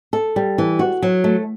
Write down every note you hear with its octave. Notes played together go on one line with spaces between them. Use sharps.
A4
G3
E3
F#4
F#3
A3